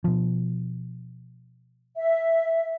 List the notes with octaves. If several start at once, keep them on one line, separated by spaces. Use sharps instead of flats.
B2 F3
E5